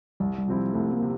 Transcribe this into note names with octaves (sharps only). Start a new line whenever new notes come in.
C2 G3
G3
C3 F3 C4 E4
C2 A3
A#3
C3